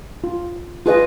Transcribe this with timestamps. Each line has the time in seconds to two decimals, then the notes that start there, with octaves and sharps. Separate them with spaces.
0.24 F4
0.86 F4 G#4 B4 D#5